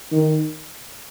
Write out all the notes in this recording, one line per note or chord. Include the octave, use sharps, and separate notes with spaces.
D#3